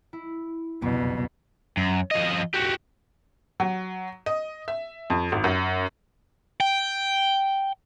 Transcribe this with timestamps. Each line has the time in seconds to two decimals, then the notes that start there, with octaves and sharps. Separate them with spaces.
0.13 E4
0.82 F#1 C2 F2 B2
1.77 F#2
2.11 F3 D#5
2.54 F#4 G4
3.60 F#3
4.26 D#5
4.68 E5
5.10 F2
5.32 G#1
5.44 F#2
6.60 G5